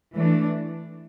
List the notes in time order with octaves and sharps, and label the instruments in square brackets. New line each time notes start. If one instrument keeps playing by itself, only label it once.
[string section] E3 A3 D4